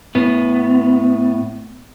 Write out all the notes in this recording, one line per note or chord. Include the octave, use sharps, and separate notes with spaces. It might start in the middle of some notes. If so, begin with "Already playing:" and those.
A2 B3